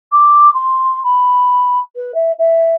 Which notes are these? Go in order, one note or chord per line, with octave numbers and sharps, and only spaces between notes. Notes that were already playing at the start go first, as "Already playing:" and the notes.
D6
C6
B5
B4
E5
E5